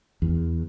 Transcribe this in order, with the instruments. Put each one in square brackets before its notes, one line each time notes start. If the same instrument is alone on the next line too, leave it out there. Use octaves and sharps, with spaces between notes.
[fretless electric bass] E2